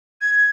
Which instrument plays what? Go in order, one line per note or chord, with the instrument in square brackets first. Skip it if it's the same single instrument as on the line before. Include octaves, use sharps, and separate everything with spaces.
[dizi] G#6